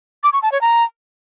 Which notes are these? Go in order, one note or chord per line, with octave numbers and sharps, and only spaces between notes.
D6
C#6
A5
C#5
A#5